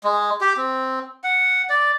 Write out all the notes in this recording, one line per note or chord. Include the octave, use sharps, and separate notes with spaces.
G#3
G4
C4
F#5
D5